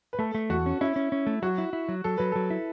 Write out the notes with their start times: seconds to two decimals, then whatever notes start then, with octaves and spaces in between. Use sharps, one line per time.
0.13 B4
0.19 A3 A4
0.35 A3
0.50 E2 F#4
0.66 C#4
0.81 C#4 E4
0.96 C#4
1.12 C#4
1.27 A3
1.42 F#3 F#4
1.58 E4
1.73 E4
1.89 F#3
2.04 F#3 A4
2.18 F#3 B4
2.32 F#3 A4
2.50 E4